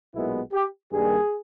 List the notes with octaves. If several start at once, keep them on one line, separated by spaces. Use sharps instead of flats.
B1 A#2 G#3 B3 E4
G4
G2 D#3 G3 A#3 G#4